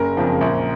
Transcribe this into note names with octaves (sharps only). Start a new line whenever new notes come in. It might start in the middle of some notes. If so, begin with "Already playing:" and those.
Already playing: F#1 A#4
F2 C#3 F3
A#1